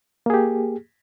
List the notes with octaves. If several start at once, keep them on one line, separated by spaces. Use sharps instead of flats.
A#3 G4 G#4